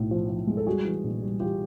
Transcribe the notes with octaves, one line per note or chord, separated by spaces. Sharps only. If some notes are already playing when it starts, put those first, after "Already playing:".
Already playing: B1 A2
F3
F3
G#3
A4
G3 F#4 G#4
E3
A#1
G3
E3 F4 G4